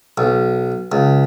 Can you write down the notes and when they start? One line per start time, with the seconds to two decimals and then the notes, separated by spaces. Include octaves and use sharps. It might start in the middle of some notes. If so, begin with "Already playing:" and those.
0.18 B1
0.92 C#2